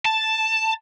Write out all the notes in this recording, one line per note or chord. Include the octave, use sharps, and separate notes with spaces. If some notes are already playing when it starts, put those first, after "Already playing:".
A5